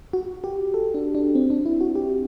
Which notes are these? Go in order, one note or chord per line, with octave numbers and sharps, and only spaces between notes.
F#4
G4
A4
D4
D4
C4
D4
E4
F#4
G4